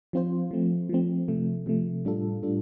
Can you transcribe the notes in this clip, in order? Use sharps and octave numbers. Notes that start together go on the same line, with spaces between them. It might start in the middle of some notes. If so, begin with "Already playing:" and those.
F3 C4 F4 C5
F3 A3 C4
F3 A3 C4
C3 F3 A3
C3 F3 A3
A2 G3 D4 F4 A4
A2 G3 D4 F4 A4